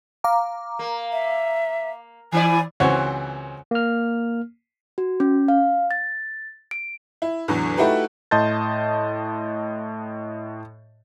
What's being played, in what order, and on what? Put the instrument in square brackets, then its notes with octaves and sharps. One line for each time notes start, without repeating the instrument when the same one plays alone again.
[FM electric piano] F5 A#5 D6
[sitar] A#3
[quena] E5
[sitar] E3 E4 D5 [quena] G#5
[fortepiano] C#2 E3 C4 F#4 C#5
[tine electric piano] A#3 F6
[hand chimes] F#4
C#4
F5
A6
D7
[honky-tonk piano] E4
E2 A2 D3 F#3
A3 D#4 E4 F#4 G4 B4
[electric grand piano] A2 D#5 A5 C6 G6 A6